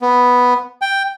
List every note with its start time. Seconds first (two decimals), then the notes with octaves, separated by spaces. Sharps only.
0.02 B3
0.82 G5